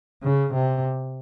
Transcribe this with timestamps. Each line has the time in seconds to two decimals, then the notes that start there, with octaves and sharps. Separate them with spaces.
0.22 C#3
0.54 C3